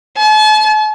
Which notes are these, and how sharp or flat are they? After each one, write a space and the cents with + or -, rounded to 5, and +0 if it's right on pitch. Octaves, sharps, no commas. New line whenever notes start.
A5 -40